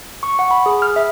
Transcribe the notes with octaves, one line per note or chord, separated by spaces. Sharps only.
C#6
F#5
B5
G#4
F6
E5